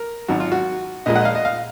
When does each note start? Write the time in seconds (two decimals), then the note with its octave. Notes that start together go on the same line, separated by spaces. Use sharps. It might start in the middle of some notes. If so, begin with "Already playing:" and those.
Already playing: A#4
0.28 G#1 G#2 F#3 F#4
0.40 F4
0.52 F#4
1.06 A#1 A#2 G#3 D#5
1.16 F#5
1.21 D#5
1.25 F5
1.35 D#5
1.45 F5